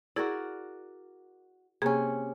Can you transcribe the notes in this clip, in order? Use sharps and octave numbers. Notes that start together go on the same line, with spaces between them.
E4 F#4 G#4 A#4 D5
C3 A#3 C#4 G#4